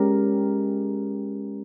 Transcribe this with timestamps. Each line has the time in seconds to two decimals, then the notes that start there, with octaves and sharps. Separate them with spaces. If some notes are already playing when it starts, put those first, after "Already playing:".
Already playing: G#3 C#4 G4 A#4